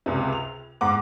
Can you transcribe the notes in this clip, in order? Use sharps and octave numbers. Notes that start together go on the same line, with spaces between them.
C#2 C3
F7
G#2 F#5 D6